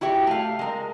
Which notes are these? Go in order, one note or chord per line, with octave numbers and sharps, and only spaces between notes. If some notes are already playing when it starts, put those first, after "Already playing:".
E4 F#4 G4 E5
A3 F5
G#3 A#4